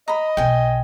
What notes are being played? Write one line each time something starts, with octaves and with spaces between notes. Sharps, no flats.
D#5 A#5 B5
B1 G5 G#5